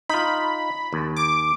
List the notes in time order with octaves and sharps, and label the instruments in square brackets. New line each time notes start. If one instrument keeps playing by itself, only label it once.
[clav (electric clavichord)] D#4 F4 [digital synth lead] B5
[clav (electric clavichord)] D#2
[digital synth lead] D6